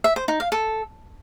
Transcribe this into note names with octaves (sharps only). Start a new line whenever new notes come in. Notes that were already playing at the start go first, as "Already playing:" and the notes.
E5
C5
D#4
F5
A4